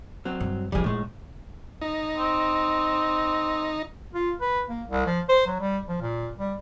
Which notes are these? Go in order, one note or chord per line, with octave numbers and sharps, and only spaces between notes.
F#3 C4
G2
F#2 F3 G3 G#4
A#1 A2 G#3
D#4
C4
F4
B4
A#3
C2
F3
C5
F#3
G3
F3
A#2
G3